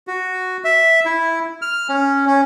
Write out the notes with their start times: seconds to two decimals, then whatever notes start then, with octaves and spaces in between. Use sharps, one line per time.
0.07 F#4
0.64 E5
1.06 E4
1.62 F6
1.89 C#4
2.26 C#4